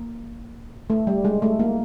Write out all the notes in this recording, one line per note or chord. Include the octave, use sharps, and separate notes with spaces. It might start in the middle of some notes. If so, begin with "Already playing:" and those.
Already playing: A#3
A3
G3
G#3
A3
A#3